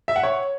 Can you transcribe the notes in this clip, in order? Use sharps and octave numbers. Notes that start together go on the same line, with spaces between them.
E5
F#5
C#5